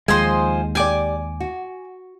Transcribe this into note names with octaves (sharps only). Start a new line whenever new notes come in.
D#2 F3 G#3 C5 D#5 G#5
G4 D5 G#5 D6
F#4